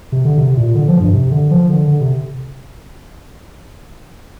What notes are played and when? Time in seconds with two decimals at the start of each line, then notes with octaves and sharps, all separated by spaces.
0.12 C3
0.25 D3
0.38 C3
0.57 A#2
0.75 D3
0.88 F3
1.00 G2
1.13 C3
1.31 D3
1.51 F3
1.69 D3
1.88 D3
2.00 C3